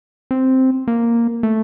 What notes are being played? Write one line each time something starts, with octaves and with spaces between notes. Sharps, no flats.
C4
A#3
A3